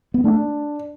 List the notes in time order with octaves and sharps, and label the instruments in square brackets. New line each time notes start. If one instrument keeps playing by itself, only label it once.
[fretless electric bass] B3
[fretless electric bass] A3 [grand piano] D4